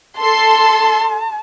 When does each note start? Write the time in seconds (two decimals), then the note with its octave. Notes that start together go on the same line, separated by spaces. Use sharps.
0.21 A4 A5 C6